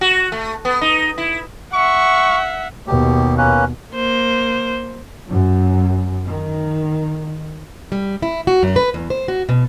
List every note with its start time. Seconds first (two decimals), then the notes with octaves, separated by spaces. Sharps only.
0.01 F#4
0.32 A3
0.65 B3
0.81 D#4
1.18 E4
1.73 E5 F#5 C#6
2.87 D#2 B2 G4
3.38 A#3 C#4 B4
3.93 A#3 C5
5.28 F#2
6.25 D#3
7.92 G3
8.22 E4
8.47 F#4
8.63 F#2
8.76 B4
8.94 E2
9.10 C5
9.28 F#4
9.49 B2